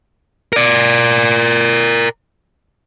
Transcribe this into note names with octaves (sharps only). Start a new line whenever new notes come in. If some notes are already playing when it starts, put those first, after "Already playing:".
A#4 D5